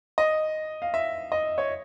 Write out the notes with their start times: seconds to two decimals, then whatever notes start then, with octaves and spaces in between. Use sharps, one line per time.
0.18 D#5
0.82 F5
0.94 E5
1.32 D#5
1.58 C#5